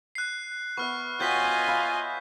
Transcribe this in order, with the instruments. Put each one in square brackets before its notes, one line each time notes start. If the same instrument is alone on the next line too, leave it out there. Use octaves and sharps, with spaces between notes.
[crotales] F#6 C7
[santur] B3 E5 [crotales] C#6 F6
[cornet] F4 [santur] F#4 C#5 G5 [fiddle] D#5 G#5 [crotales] G6 B6
[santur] E5 F5 B5